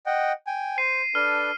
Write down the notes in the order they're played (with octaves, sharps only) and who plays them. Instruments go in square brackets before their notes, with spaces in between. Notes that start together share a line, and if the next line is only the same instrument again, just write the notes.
[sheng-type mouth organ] D#5 F#5 G5
G5 G#5
[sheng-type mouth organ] C5 [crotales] C7 D#7
[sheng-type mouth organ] D4 A4 B4 [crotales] F6